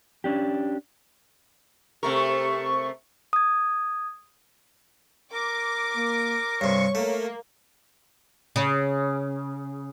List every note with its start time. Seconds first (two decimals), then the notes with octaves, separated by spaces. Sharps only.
0.24 C#4 D4 G4
2.03 C3 A3 A#4 C#6
3.33 D#6 G#6
5.33 A#4 D6
5.96 A#3
6.61 G2 C3 C#5 C#6
6.95 A3 A#3
8.56 C#3